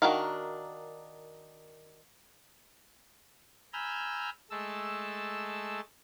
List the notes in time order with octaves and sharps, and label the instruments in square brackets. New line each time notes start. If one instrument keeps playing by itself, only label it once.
[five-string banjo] D#3 D4 F#4 A#4 F5
[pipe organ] G#5 A#5 B5 E6 F6 G6
G#3 A3 A5 E6